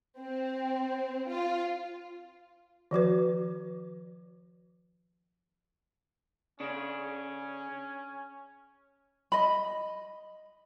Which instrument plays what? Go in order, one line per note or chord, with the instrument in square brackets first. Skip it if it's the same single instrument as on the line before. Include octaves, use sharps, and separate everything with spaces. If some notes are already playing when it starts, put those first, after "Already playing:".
[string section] C4
F4
[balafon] D#3 F3 F#4 B4
[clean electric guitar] C#3 D4 [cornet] C#4
[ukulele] D#5 B5